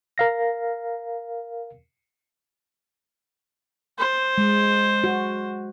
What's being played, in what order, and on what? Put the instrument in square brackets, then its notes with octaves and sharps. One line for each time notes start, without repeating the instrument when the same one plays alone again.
[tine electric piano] A#4 F5 A#6
[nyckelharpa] C5
[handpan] G#3
F#4